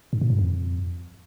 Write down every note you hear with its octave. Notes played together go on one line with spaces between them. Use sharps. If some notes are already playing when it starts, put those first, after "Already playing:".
G#2
A#2
G2
F2